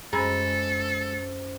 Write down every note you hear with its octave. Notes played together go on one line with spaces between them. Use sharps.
F#2 G#3 C#4 A4 C5 B5 E6